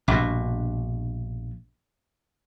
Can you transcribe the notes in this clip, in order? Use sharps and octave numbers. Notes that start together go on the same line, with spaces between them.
A#1 G2 B2